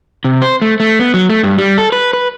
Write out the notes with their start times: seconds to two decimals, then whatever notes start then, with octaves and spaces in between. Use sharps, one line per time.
0.24 C3
0.42 C5
0.62 A3
0.80 A3
0.99 B3
1.14 F#3
1.30 A3
1.44 G2
1.58 G3
1.78 A4
1.92 B4
2.13 B4